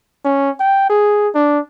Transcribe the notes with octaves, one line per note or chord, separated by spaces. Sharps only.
C#4
G5
G#4
D4